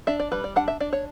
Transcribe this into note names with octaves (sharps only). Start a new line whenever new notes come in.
D4 E5
D5
G3 B4
D5
D4 F#5
E5
D4 D5
C#5